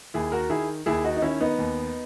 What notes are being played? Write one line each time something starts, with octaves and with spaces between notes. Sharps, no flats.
D#2 E4 G#4
F#4 A#4
D#3 E4 G#4
D#2 E4 G#4
D#4 F#4
D#4
D#3 C#4 E4
B3 D#4
D#2